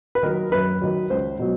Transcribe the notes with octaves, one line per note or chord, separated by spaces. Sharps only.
B4
D#3 F#3 A#4
F#2 B4
D#3 F#3
C#2 C5
B2 F#3